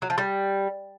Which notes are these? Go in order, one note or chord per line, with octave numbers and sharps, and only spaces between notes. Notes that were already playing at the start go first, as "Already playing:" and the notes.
F#3
F3
G3